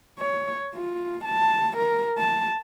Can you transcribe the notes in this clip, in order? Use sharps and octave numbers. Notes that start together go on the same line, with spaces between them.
C#5
F4
A5
A#4
A5